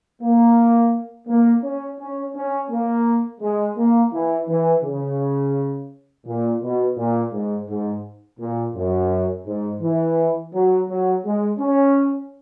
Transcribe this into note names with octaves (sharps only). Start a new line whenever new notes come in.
A#3
A#3
C#4
C#4
C#4
A#3
G#3
A#3
E3
E3
C#3
A#2
B2
A#2
G#2
G#2
A#2
F#2
G#2
E3
F#3
F#3
G#3
C#4